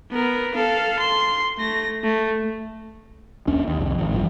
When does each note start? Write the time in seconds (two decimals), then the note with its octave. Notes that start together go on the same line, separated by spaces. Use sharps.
0.11 B3 A#4
0.54 A4 F5
0.99 C6
1.59 A3 A#6
2.04 A3
3.47 D#2 C#4 D4
3.68 D#2
3.79 C2 F2
3.98 G#1
4.13 A1 G2 F3